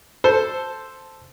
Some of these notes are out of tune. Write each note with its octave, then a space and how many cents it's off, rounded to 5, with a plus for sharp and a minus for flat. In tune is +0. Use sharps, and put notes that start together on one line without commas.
A4 +0 C5 +0